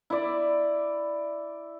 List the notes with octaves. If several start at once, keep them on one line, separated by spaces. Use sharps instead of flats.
E4 D5